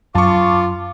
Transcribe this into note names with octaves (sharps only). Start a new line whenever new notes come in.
F#2 F4 A5 C#6 D6